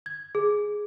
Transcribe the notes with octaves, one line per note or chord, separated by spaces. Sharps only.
G#6
G#4